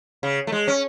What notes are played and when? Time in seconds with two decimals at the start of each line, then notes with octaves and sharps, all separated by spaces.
0.23 C#3
0.47 A3
0.52 G#3
0.68 C#4